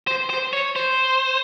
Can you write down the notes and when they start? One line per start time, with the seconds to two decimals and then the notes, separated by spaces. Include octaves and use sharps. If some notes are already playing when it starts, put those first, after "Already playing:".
0.07 C5
0.30 C5
0.53 C#5
0.76 C5